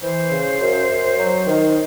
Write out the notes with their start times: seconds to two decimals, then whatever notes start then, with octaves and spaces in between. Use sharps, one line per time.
0.03 E3 C5
0.32 C#3
0.61 F#2
0.89 F#2
1.18 F#3
1.47 D#3